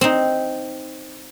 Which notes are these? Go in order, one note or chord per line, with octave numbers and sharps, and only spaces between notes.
C4 D#4